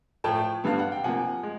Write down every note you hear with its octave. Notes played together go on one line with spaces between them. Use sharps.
A2 F3 A3 G5 A5
G2 D3 G3 B3 F5
F#5
G5
C3 F3 A#3 F#5 G#5
G#3